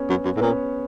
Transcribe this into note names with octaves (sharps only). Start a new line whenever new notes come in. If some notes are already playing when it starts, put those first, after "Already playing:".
Already playing: B3 C#4
F#2
F#2
A2
A#2 B3 C#4